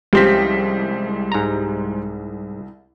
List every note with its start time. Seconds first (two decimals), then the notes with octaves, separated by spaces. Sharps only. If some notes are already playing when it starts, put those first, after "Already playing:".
0.13 C2 F3 G#3 C4 C#4 G4 C5 B6
1.32 G#2 A#5